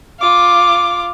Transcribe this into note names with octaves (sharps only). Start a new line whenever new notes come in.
F4 D6